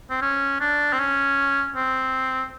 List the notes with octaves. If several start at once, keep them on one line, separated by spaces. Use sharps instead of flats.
C4
C#4
D4
C4
C#4
C4